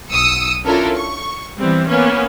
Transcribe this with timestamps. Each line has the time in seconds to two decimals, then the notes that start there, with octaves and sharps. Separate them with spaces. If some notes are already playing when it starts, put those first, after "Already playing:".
0.11 B1 D#6 E6 C#7
0.65 C#4 D4 E4 F4 A4 A#4
0.96 C#6
1.59 E3 G3 B3 C4
1.89 A#3 B3 C#4 B4